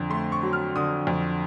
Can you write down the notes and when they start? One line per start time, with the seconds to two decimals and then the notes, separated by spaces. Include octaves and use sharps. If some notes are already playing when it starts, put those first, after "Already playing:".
Already playing: F2 D3
0.10 A3 C6
0.32 C#6
0.43 F#3
0.53 F6
0.75 D3 D#6
1.07 F2